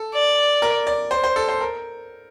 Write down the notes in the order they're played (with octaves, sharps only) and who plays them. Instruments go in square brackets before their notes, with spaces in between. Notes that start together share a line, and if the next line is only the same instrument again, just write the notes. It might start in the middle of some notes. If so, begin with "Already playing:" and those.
Already playing: [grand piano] A4
[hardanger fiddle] D5
[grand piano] A#4
D5
C5
C5
A4
C5
A#4